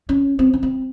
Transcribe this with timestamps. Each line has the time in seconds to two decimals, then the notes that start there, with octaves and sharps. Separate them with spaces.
0.09 C#4
0.39 C4
0.54 C#4
0.63 C4